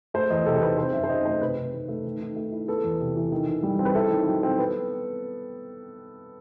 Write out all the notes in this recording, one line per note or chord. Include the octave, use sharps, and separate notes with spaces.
A3 C5
E2 D#5
C3 A4
C5
D#3 B4
C4 C5
F#2 E5
C5
D#3 D#5
A3 C5
C3 B4
C3
D#3
A3
D#3
D#3
A3
E4
B3 A4
E2
C3
E3
D#3
D#3
G3
C4
B4
E4 A4
D#3
F#3
C4
B3